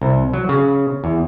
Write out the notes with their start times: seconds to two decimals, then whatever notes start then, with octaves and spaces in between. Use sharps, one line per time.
0.02 C2
0.34 F#3
0.49 C#3
1.04 E2